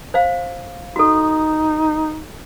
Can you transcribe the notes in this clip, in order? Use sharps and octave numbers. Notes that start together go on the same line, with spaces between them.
C5 F5
D#4 F#4 A4